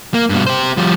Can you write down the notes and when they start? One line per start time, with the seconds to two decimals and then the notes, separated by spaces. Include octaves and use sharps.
0.14 A#3
0.29 G2 B2
0.47 G4 C5
0.77 F3 G3